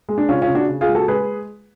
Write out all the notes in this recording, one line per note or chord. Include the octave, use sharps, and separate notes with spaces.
G#3
D4
C#3 C#4 F4
C#4 F4
C#3
D4 F#4
C#3
F4 G#4
G#3
F#4 A4
G#3 G#4 B4